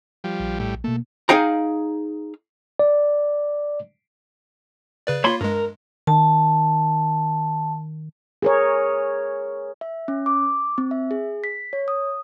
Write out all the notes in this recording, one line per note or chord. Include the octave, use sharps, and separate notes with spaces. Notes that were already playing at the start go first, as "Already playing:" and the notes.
F3 G3
A#1
A2 G3
B2 A3 A#3
D#4 G#4 F5 G5 A#5
D5
C#3 B4 D5
A#3 F4 C#5 B5 C6
G2 G#3 A#4
D#3 A5
G#4 A#4 C#5
E5
C#4
D6
C4
E5
G#4
B6
C#5
D#6